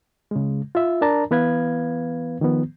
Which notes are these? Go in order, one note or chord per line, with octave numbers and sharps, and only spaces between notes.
C#3 G#3
F4 E5
D4 A#4 D5 A5 A#5
E3 B3 B4 F5 G#6
D#3 F3 B3